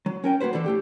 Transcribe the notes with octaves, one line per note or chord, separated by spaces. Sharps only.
F#3
C#4 A#4 G5
F#3 A#3 F#4 B4 C5
D3 E3 D4 A4
A2 A3 G4